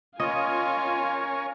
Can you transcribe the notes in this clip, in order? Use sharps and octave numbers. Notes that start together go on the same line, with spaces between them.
C#4 F4 A#4 C#5 D#5 F5 G#5